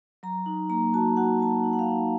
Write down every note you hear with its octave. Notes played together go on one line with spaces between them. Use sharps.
F#3 A#5
D#4
A#3 A#5
F#4 A5
F#4 F#5
F#4 A5
F#5
D#4
F#5
F5
D#4